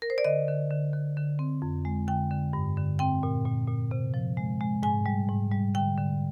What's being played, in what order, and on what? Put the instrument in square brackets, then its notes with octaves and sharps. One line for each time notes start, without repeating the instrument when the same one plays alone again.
[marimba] A#4
C5
D5
D3 D#5
D3
D3
D3
D3
C4
F2
G#3
D3 G5
D3
G2
D3
C4 G5
A#2
A#2
A#2
C3
F3
G#3
G#3
G#2 G#5
G3
G#2
G3
D3 G5
D3